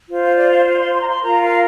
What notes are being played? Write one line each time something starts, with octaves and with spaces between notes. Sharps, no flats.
F4 C5
F5
D5
F5
F5
C6
C6
A#5
C6
F4 A#4 A#5
F5